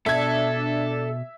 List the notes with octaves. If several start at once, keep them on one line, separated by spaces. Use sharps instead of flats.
B2 D4 A4 E5 G#6